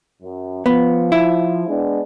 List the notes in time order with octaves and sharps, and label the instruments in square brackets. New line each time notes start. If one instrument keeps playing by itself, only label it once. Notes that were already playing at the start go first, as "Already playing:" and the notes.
[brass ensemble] F#2
[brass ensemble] F3 [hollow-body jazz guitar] B3
[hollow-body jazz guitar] E4
[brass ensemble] G#3 B3 D4